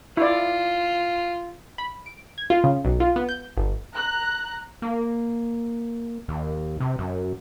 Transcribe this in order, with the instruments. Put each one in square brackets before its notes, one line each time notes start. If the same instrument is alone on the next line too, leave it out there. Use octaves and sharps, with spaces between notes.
[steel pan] E4 D5 [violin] F4
[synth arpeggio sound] B5
D7
G#6
F4
C#3
B1
F4
B3
G6
G1
[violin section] A#5 F#6
[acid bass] A#3
D#2
C3
F#2